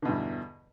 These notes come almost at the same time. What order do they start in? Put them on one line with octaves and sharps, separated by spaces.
D3 B2 G2 E2